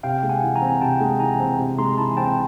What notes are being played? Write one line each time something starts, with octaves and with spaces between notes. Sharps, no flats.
C3 F5 G5
G#3
F#5 G#5
E3
G#5 A#5
C4
C3 G5 A5
G#3
E3 G#5 A#5
C4
C3
G#3 A#5 C6
E3 A5 B5
G#5
C4 G5 A5